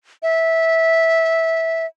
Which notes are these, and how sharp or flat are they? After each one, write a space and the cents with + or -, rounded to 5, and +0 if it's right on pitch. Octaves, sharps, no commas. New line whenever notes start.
E5 -15